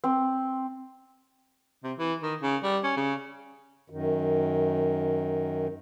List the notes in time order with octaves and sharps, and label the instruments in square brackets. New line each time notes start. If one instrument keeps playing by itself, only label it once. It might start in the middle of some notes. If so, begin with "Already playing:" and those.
[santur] C4
[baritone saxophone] C3
E3
D#3
C#3
G3
C#4
C#3
[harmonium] F#2 D#3